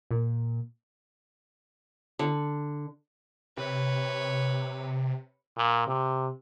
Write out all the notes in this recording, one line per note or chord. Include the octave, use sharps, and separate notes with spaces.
A#2
D3
C3 B4 C#5
A#2
C3